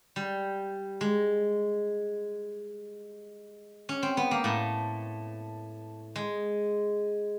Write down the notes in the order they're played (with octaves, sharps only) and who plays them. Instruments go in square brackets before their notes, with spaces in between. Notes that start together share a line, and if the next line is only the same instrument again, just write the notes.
[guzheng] G3
G#3
C#4
C4
B3
A#3
A2 A3
G#3